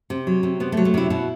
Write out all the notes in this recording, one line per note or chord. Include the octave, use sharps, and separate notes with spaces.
C3
F#3
C3
C3 B3
A3
F#3
A3
C3 E4
B2 E4